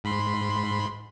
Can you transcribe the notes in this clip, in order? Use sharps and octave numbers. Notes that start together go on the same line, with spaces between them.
G#2 B5 C6